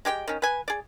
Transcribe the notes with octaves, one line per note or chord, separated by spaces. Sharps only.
G#3 G4 C5 G5
D#3 C#4
B4 G#5
G#4 D5